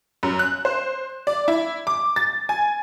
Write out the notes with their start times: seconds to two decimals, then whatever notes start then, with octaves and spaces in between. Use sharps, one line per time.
0.23 F#2
0.39 F#6
0.65 C5
1.27 D5
1.48 E4
1.87 D6
2.16 A6
2.49 G#5